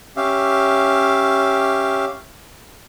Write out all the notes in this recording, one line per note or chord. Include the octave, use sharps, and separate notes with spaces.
C#4 G4 E5 F5